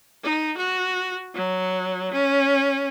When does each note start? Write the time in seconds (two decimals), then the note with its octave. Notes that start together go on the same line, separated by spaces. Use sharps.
0.23 D#4
0.57 F#4
1.34 F#3
2.13 C#4